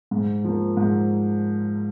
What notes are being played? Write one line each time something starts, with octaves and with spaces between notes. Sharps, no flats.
G#2
F3 A#3
G#2